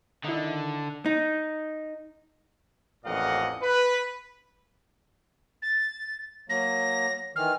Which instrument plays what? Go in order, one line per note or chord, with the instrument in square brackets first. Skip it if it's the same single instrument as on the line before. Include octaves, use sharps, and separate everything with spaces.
[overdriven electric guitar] D3 [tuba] D#3 [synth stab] D#4 E4
[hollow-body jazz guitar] D#4
[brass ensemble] A1 F2 A#2 D#5 F5 F#5
B4
[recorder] A6
[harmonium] F#3 A#3 [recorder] A#6
[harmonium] D#3 E3 [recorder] F6